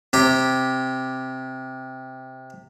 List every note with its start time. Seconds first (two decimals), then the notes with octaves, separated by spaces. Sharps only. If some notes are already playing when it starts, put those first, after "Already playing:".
0.13 C3 G4